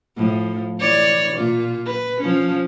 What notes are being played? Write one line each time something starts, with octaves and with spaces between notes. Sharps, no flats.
A2 F3
E3 C#5 D5
A#2 F4
B4
F3 C#4